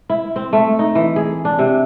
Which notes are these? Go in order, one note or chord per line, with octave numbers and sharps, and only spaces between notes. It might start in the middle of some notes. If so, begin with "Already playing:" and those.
E4
C4
A3
D#4
E3
G#4
D4
C3